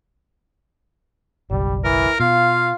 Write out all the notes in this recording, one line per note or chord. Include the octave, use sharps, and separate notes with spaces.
F#1 B1 G3
E3 A#4
B2 F4 F5